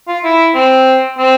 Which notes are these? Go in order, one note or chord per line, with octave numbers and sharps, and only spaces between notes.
F4
E4
C4
C4